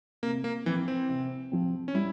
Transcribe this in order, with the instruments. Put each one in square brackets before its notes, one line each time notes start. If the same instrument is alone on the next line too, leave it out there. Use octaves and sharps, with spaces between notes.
[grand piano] C3 [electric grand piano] A#3
[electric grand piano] A#3
[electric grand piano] E3 [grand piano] F3 C4
[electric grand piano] C4
[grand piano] C3
F3 C4
[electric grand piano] C#4
[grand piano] G3 [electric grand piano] E4